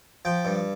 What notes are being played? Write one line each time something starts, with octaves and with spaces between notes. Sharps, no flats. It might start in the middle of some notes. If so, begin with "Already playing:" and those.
F3 G5
G2